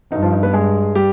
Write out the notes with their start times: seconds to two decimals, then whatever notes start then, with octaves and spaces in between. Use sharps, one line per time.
0.11 G2 D#4
0.22 F3 F4
0.33 D#4
0.43 B3 B4
0.53 G#3 G#4
0.95 G3 G4